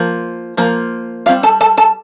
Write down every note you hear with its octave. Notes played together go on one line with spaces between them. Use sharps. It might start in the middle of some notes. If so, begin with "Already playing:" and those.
Already playing: F3 A#3
F3 A#3
G3 C4 F4 F5
A4 A5
A4 A5
A4 A5